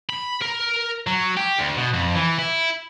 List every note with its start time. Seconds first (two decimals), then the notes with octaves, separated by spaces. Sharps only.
0.10 B5
0.42 A#4
1.07 F#3
1.37 G4
1.59 D2
1.77 B2
1.93 F2
2.15 E3
2.39 E4